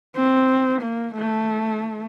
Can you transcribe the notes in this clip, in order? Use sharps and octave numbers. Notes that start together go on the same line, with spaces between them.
C4
A#3
A3